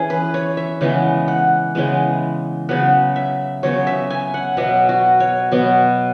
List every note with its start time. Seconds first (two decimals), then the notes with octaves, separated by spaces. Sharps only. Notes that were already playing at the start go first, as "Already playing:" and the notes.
Already playing: E3 C#4 G#4
0.10 B4
0.34 C#5
0.57 E5
0.81 C#3 E3 G#3 B3
1.28 F#5
1.75 C#3 E3 G#3 B3
2.69 C#3 F#3 B3 F#5
3.16 E5
3.63 C#3 F#3 B3 C#5
3.87 E5
4.10 G#5
4.34 F#5
4.57 B2 F#3 B3 E5
4.89 F#4
5.20 C#5
5.51 B2 F#3 B3